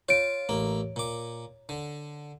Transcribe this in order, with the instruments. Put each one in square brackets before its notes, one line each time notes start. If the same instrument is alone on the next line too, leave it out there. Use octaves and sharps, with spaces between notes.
[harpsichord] F4 [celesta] C#5 D7
[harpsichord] A1 A#3
A#2 D6
D3